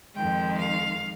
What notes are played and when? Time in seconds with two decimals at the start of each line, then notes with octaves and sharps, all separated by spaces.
0.14 F2 D#3 G#3 G5
0.59 F5